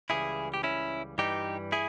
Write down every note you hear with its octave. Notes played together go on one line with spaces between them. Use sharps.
C#2 C#3 E3 G3 E4 G#4
G4
C#4 E4
G2 E3 G3 D#4 G4
E4 G#4